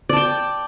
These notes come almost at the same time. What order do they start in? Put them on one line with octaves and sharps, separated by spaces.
D5 A5 G5